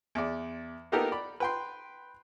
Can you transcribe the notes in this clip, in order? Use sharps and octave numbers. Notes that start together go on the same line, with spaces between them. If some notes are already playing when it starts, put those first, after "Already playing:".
E2 D5
A#3 B3 D#4 G4 A4 A#4
D5 B5
B4 G5 C6